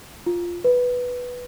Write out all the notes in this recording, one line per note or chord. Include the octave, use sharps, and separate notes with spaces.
F4
B4